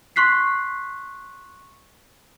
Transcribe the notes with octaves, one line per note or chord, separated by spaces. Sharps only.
C6 C#6 F#6 B6 C7